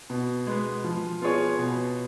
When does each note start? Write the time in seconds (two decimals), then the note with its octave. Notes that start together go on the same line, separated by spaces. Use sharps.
0.10 B2
0.47 G#3 B3
0.84 F3
1.21 B3 F4 G#4 C#5
1.59 B2